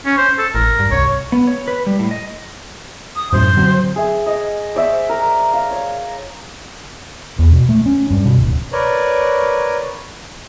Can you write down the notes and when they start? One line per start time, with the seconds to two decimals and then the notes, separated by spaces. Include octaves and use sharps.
0.06 C#4
0.18 C5
0.39 A4
0.55 A1 A#4
0.79 G2
0.92 C2 C#5
1.32 B3
1.47 C#5
1.68 B4
1.87 G3
1.99 A2
2.11 D#5
3.16 D#6
3.32 F#2 A2 C5
3.57 D3 F#3 C4
3.96 G#4 E5 G#5
4.26 D#5
4.75 C5 D5 E5 C#6
5.09 A#4
5.53 F5
5.71 C#5
7.39 E2
7.51 B2
7.69 A3
7.86 C#4
8.10 G2
8.25 B2
8.38 D1
8.72 A#4 B4 C#5 D5